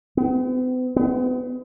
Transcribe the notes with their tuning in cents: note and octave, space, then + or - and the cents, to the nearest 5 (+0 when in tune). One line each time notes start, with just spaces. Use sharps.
B3 +45
B3 +35